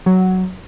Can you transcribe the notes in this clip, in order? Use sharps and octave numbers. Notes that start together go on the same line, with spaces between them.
F#3